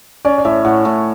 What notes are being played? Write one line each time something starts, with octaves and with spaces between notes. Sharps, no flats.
C#4 D5
D5
A2 E5
A2 F#5
A2